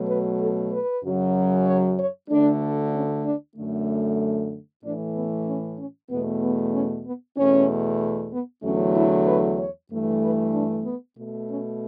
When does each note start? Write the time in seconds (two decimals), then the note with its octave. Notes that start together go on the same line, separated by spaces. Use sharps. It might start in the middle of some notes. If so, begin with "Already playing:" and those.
Already playing: B2 F#3 A3
0.08 B4
0.39 A4
0.71 B4
1.03 F#2 C#3 F#3
1.66 C#5
1.98 C#5
2.30 D2 D3 A3 D4
2.93 C#4
3.25 D4
3.56 F#2 D3 A3
4.83 A2 E3 A3 D4
5.15 B3
5.46 C#4
5.79 C#4
6.10 E2 B2 A3 B3
6.42 B3
6.73 C#4
7.05 B3
7.37 E2 B2 A3 C#4
8.32 B3
8.63 E2 D3 F#3 A3 C#4
8.95 E4
9.27 B4
9.59 C#5
9.90 G2 E3 A3
10.22 B4
10.54 D4
10.85 B3
11.17 B2 A3
11.49 C#4